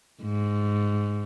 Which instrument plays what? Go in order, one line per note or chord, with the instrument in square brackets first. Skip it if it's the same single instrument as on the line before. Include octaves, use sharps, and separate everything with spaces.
[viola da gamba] G#2